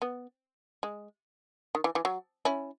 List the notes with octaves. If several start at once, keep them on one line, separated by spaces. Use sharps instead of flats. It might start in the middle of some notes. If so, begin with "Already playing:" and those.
B3
G#3
D#3
E3
E3
F#3
C#4 E4